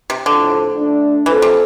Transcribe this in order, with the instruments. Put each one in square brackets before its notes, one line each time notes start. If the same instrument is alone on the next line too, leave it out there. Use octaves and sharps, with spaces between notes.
[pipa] C3
[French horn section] A2 F3 C4 F4 A4 [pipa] D3
[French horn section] D3 A3 D4
[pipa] E3 [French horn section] F3 C4 F4 A4
[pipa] C3